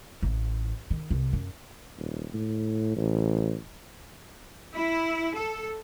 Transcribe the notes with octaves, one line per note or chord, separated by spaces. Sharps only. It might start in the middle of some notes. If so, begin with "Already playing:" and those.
A1
D#3
C2
F#2
D#1
A2
A1
E4
A4